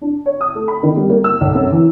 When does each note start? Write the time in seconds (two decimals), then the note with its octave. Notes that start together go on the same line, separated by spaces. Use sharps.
0.01 D4
0.26 C#5
0.41 D#6
0.55 A3
0.68 B5
0.83 D#3
0.96 G3
1.10 A#3
1.24 E6
1.41 B1
1.55 F#2
1.71 E3